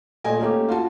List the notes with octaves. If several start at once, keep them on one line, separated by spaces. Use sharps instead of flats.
A#2 A3 D#5 G#5
A3 A#3 C#4 G4
F4 F#4 A5